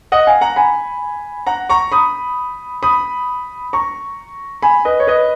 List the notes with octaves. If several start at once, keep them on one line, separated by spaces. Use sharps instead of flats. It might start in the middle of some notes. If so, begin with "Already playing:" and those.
D#5 F#5
F5 G#5
F#5 A#5
G#5 B5
F#5 A#5
A#5 C#6
B5 D#6
B5 D#6
A#5 C#6
G#5 B5
B4 D#5
C#5
B4 D#5